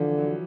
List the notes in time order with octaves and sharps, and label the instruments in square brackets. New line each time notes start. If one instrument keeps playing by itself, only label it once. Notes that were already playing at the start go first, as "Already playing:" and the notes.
Already playing: [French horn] D3 [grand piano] E3 F3
[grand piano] F#3